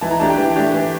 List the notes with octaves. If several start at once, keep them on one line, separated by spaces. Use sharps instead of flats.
E3 A5
A#5
A3 D4 G4 A5
G5
E3
A3 D4 G4
E3